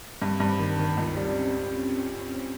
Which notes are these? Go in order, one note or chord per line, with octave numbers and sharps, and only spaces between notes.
G2 C4
G2
D#3
D#3
C#2 C#4
G3